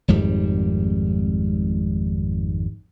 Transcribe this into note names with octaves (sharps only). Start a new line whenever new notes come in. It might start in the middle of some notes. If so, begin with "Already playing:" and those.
G#1 F2 G#2 G3